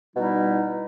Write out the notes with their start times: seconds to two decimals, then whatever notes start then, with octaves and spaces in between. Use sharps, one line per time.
0.16 B2 G3 D#4 E4